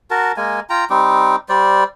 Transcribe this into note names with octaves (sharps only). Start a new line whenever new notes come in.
F#4 A#4 A5
G#3 A#3 G#5
F4 G5 A#5
G3 C4 D#4 D6
G3 C5 D5